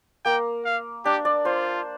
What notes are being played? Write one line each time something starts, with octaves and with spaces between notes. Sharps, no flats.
A#3 G5
F5
D4 G4
D5
F4 C5